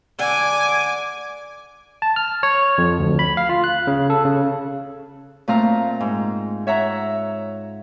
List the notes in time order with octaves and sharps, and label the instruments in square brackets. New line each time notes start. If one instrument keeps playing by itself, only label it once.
[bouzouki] D3 [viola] G#5 D6
[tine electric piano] A5
F6
C#5
F2
D2
B5
F5
F4
F#6
C#3
A4
C#3
[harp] A#2 A3 C4 F5 A#5
G#2
C#5 E5 F#5 A#5